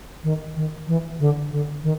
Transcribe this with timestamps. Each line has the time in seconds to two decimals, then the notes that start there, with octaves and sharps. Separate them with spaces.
0.24 D#3
0.56 D#3
0.87 E3
1.19 D3
1.52 D3
1.83 D#3